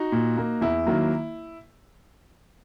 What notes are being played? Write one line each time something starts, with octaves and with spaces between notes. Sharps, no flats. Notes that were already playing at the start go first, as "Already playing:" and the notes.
Already playing: D#4 F#4
A#2
A#3
E2 E4
D#3 F#3 A#3